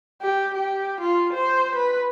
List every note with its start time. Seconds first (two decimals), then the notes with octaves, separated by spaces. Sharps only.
0.22 G4
0.55 G4
1.01 F4
1.33 C5
1.76 B4